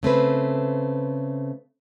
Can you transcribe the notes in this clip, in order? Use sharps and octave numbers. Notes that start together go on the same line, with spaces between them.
C#3 A3 C4 B4